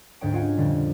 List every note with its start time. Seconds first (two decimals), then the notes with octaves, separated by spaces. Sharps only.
0.21 D2 G#2 C#5 G5 D7
0.33 C#4 F4 F#4 C#5 F#5 G#5
0.57 F2 A#2 D3 G3